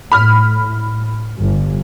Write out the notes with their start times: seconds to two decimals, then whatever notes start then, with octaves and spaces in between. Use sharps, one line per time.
0.12 A2 B5 F6
1.38 G1